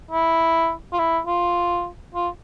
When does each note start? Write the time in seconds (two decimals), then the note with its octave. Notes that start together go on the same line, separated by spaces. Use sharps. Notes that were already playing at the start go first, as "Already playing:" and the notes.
0.11 E4
0.93 F4
0.99 E4
1.27 F4
2.15 F4